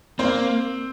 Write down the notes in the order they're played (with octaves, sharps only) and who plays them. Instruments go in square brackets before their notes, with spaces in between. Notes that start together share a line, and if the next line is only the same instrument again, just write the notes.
[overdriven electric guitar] A#3 [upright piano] C4 C5